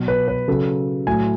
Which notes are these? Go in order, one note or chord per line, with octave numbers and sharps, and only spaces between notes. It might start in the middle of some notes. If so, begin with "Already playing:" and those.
Already playing: B2 F#3
B4
B4
C#3 F#3 A4
A2 F#3 G#5